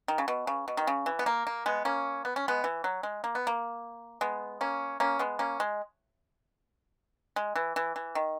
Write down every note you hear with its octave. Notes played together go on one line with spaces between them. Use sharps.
D#3
C#3
B2
C#3
B2
D#3
C#3
E3
B3
A#3
A#3
G#3 B3
A#3 C#4
B3
C#4
G#3 B3
E3
F#3
G#3
A#3
B3
A#3
G#3 B3
A#3 C#4
A#3 C#4
G#3 B3
A#3 C#4
G#3
G#3
E3
E3
E3
D#3